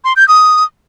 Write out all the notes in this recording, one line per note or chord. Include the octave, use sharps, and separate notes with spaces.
C6
G6
D#6